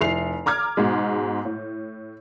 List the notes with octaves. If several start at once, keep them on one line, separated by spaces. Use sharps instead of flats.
F1 E4 C7 F7
A#5 D6 F6 G#6
G#2 B2 G#3
A2